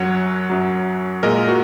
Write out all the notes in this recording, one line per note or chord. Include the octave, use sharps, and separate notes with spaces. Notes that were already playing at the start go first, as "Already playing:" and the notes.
Already playing: F#2 F#3 C#5 F#5
F#2 F#3
A#2 G#3 A#4 D#5
F#4 A#4